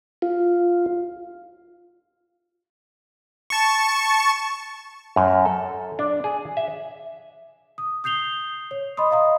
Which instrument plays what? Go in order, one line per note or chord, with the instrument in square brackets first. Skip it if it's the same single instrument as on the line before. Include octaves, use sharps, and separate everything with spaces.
[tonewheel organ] F4
[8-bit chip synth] A5 C#6
[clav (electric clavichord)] F#2
A4
D4
G#4
E5
[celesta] D#6
D#6 G6 C7 F7 G7
C#5
D#5 B5 C6 D#6
D#5 F5 A#5 D#6